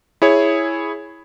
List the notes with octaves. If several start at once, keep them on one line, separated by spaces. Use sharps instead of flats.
E4 G#4 C#5